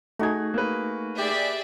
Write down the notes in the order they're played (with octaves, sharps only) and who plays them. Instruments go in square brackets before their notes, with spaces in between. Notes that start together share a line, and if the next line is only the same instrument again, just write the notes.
[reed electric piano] A3 D#4 G#6 [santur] F#4 G#4
[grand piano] A#3 B4
[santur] G4 [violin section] G#4 D5 E5